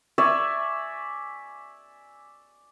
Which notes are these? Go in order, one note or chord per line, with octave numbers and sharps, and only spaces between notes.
D5 E5 G#5 C#6